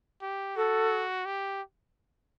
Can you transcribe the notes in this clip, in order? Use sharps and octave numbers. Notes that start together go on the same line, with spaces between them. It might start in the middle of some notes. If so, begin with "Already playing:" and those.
G4
F#4 A4
G4